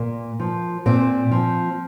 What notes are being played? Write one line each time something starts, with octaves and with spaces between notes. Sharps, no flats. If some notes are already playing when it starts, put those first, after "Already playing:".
Already playing: A#2 A#3
F3
A#2 C4
F3